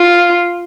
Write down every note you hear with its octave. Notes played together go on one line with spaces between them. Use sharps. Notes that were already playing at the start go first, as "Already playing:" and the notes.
Already playing: F4